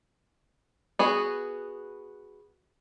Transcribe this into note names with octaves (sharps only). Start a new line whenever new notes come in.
B3 F#4 G#4